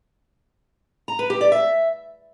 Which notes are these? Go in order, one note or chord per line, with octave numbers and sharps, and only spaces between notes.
A#5
B4
G4
D5
E5